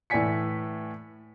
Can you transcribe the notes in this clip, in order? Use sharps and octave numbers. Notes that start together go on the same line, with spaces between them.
A2 E3 D5 G#5 B6 C#7